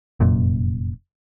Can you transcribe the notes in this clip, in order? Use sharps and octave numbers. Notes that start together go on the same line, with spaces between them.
F1 F#2 A#2